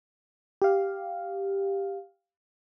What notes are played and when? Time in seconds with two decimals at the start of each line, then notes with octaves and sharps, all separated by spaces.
0.62 G4 F5